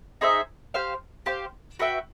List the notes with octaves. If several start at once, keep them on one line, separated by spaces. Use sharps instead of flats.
D#4 G#4 C5 E5
G4 C5 F5
G4 C5 F5
F#4 B4 E5 G5